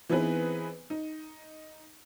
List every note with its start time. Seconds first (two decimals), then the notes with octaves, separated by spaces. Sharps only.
0.09 E3 B3 C4 D#4 G#4 B4
0.90 D#4